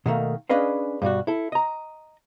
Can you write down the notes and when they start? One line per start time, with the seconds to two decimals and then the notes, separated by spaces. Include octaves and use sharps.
0.06 B2 D#3 A3 A#3
0.49 C#4 D4 G#4 B4 D#5 F5
1.02 G2 B2 G3 F#4
1.27 E4 A4
1.52 D#5 A#5